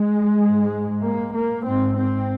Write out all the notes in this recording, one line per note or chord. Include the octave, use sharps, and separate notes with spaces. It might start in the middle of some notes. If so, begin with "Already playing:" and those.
Already playing: G#3
G#2
A#3
A#3
G#2 C4
C4